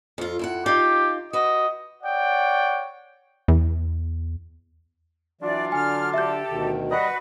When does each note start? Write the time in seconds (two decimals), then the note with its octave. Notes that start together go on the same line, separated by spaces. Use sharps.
0.18 F2 F4
0.39 F2 E4 F#5
0.66 D#4 F4 G4
1.33 F#4 B4 D#5
2.02 C#5 D5 F#5 G5
3.48 E2
5.41 E3 F#3 D4 F4 D5
5.72 D3 G#5 F6
6.14 G4 A4 E5 G6
6.50 D2 B2 D#3
6.90 G3 F#4 B4 D#5